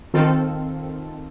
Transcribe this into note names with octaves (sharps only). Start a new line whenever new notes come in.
D#3 C4 F4 A4